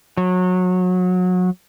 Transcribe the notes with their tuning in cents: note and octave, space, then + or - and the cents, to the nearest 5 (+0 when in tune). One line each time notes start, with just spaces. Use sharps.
F#3 -25